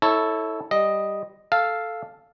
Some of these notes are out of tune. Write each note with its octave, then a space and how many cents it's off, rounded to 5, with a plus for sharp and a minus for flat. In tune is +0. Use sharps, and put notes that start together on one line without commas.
E4 -25 A4 +0 C#5 +0
G3 +0 D#5 +0
A4 +0 F5 +0